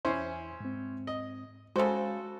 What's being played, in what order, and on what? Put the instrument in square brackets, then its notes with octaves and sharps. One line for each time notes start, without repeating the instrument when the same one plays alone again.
[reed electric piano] E2 G#5 C6 [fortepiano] C#4 E4 C5
[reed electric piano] G#2 C4
[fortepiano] D#5
[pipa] C#3 C5 [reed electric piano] G#3 [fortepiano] F#4 A4